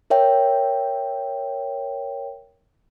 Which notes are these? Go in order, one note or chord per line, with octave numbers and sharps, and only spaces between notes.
A#4 C#5 E5 G5